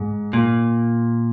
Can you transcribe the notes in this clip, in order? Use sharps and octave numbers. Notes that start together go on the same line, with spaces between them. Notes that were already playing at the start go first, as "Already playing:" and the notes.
Already playing: G#2
A#2